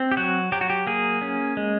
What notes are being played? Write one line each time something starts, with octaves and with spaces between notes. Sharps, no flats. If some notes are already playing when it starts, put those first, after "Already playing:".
Already playing: C4
G4
F#3 F#4
F#3 G4
F#4
G4
A#3 G#4
C#4
G#3